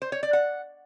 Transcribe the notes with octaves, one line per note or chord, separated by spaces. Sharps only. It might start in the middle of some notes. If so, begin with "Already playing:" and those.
C5
C#5
D5
F#5